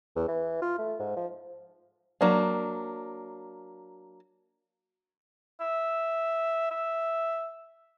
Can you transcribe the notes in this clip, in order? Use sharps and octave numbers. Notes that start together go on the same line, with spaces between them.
E2
E3
F4
A3
G#2
F3
F#3 A#3 D4
E5
E5